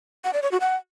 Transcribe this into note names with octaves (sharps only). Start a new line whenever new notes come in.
F#5
D5
C#5
F#4
F#5